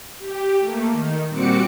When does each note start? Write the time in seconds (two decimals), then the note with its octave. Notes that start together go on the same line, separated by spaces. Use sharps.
0.19 G4
0.60 A3 A#3
0.91 D#3
1.28 A#2 G3 C4 F#4 D6 C#7